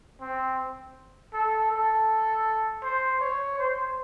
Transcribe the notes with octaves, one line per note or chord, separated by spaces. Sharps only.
C4
A4
A4
C5
C#5
C5